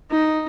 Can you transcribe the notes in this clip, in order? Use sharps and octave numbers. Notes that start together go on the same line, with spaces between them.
D#4